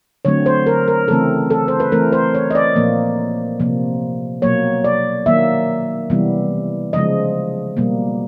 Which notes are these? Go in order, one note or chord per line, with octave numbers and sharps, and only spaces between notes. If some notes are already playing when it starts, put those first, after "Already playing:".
D3 F#3 A3 C4 C#5
C5
A#4
A#4
C#3 E3 A3 C4 A4
A4
C5
B4
E3 A3 C4 A#4
C5
C#5
D#5
D5
A#2 F3 A#3
C3 F3 A#3
B2 F#3 A#3 C#5
D5
D#3 F#3 A#3 E5
C3 E3 G3 B3
C#3 F3 G#3 D#5
B2 G3 A#3